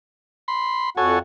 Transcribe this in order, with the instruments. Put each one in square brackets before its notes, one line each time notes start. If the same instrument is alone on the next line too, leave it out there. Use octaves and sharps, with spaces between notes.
[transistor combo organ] B5 C6
[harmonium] F2 F#4 F#5 [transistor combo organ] A4 C#5 G#5